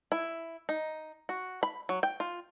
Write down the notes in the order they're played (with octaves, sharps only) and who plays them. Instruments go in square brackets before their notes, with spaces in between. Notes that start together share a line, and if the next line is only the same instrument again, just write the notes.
[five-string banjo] E4
D#4
F#4
B5
F#3
G5
F4